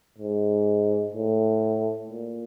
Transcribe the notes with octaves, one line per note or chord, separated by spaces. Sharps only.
G#2
A2
A#2